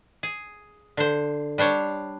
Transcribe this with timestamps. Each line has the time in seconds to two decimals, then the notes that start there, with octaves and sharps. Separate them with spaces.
0.23 G#4
0.97 D3 C5
1.58 G3 D4 C5 C#5